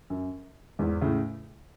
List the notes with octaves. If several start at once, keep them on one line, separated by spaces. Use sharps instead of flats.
F#2
E2 G#2
A2 C#3